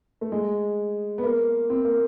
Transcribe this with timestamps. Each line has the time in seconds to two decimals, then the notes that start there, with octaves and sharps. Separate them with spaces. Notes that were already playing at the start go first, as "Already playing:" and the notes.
0.21 A3
0.32 G#3
1.18 B3
1.24 A#3
1.70 C4
1.84 A#3